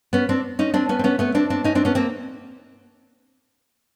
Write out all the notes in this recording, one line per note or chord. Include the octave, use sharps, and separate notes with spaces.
B3 C#4
C4 D4
C#4 D#4
C4 D4
B3 C#4
C4
B3 C#4
A3 B3
C4 D4
C4 D4
C#4 D#4
C4 D4
B3 C#4
A#3 C4